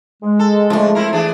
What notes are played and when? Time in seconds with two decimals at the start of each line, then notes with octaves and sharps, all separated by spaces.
0.23 G#3
0.39 A4
0.70 F2 F3 A3 D4
0.95 C4 E4 A#4
1.13 E3 D4 G#4